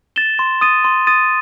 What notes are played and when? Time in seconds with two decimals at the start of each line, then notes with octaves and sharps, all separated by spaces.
0.16 A6 E7 G7
0.39 C6
0.61 D#6 A6 D#7
0.84 C6
1.07 D#6 A6 D#7